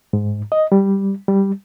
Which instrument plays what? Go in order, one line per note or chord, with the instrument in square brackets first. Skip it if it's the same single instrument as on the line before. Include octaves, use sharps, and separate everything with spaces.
[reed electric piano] G#2
D#5
G3
G3